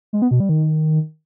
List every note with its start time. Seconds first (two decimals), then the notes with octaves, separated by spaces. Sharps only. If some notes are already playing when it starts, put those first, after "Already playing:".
0.13 G#3
0.22 B3
0.31 B2
0.40 G3
0.49 D#3